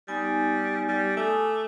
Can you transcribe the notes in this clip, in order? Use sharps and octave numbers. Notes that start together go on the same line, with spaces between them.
G3 B3 D#4 G#5
G3
A3 G#5 D6 D#6